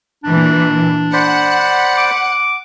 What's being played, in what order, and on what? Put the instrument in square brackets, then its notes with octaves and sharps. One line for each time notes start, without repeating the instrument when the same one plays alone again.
[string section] A#2 E3 [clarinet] D4
[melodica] C5 D5 B5 [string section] F#5
[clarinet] D6